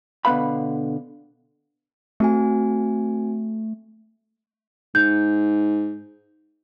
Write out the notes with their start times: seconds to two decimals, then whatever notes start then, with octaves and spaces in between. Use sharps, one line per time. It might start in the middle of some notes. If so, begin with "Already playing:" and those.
0.25 B2 D3 B3 B4 F5 B5
2.20 A3 C4 F#4 G#5
4.95 G#2 G6